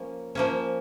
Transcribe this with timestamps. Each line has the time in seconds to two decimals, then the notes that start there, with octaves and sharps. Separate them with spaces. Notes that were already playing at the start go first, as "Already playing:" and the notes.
Already playing: F3 A#3 C#4
0.35 F3 A#3 C#4